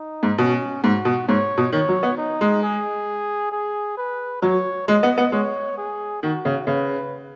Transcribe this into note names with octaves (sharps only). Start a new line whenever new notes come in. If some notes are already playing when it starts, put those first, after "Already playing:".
Already playing: D#4
G#2
B2 C#4
G#2 F#4
B2
G#2 C#5
B2
D#3 C#5
F#3
B3
D#4
G#3
G#4
G#4
B4
F#3 C#5
G#3 D#5
B3
B3
G#3 C#5
G#4
D#3 F#4
C#3
C#3 B4